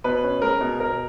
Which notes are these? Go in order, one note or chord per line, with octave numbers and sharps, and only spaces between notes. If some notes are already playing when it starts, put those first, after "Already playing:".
B2 B4
C#4
G#3 A#4
B2
B2 A#4